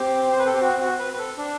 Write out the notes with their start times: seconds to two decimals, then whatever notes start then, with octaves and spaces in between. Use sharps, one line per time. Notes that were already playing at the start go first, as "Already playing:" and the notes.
Already playing: C4 G4
0.32 C5
0.39 B4
0.46 A4
0.54 G4
0.61 F#4
0.80 F#4
0.99 B4
1.13 B4
1.18 A4
1.37 D4